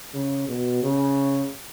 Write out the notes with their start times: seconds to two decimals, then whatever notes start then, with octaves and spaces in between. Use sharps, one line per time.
0.14 C#3
0.48 B2
0.83 C#3